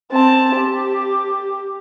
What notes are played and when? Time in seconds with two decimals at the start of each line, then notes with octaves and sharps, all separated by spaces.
0.11 C4 A5
0.56 G4